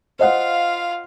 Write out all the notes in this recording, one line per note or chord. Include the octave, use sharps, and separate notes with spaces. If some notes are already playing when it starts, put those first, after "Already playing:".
F4 C5 D#5 F5 F#5